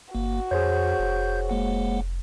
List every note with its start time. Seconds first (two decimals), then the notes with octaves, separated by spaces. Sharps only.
0.15 G1 A#3 F#4
0.51 F2 G#4 C5 C#5 G6
0.99 F1
1.50 G#3 A#3 F#5